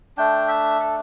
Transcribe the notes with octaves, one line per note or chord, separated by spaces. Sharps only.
A3 D4 G5
E5
A4